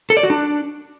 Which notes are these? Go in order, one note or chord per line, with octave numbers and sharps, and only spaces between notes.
A4
D5
F#4
D4